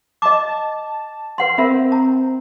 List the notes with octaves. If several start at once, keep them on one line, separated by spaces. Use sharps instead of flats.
D#5 A5 D6
B4 F#5 C6
C4 A#4 E5 B5
A#5